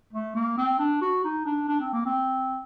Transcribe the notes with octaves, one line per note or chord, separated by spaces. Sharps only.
A3
A#3
C4
D4
F#4
D#4
D4
D4
C4
A#3
C4